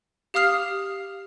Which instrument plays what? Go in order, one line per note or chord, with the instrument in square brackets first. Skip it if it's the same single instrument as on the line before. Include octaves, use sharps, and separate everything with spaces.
[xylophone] G4 F5 D#6 F6 C7 F7